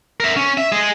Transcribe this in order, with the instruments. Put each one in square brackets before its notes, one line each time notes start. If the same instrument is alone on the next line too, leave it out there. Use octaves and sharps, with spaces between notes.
[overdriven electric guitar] A#4 E5
C#4
E5
G#4 D#5